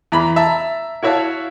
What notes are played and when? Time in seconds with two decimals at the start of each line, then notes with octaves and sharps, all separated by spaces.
0.12 E2 A#5 B5
0.36 E5 A5 A#5
1.03 E4 F#4 C#5 E5 F5 A5